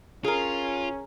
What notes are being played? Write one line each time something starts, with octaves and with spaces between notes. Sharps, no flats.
C#4 F4 G#4 A#4